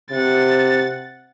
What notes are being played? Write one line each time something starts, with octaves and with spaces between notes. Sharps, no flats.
C3 F#5 A6